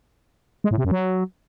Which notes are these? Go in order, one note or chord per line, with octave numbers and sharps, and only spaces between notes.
G#3
A2
C3
F#2
F#3